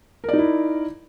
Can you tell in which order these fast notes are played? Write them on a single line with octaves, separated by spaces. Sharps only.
A#4 D5 D#4 E4